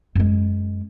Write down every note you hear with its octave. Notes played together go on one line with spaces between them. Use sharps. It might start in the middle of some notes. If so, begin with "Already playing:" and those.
F#2 G#3